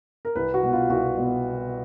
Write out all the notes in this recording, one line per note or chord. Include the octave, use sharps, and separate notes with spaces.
A#4
C2 B4
F#4
B2
F4
C2 F#4
B2